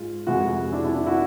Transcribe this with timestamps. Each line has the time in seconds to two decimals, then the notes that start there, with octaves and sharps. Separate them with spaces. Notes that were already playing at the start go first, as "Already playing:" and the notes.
Already playing: G#2 F4
0.27 F2 C3 E3 G#3 E4 F#4
0.72 D4 E4
0.84 D4 E4
0.95 D4 E4
1.06 E4 F#4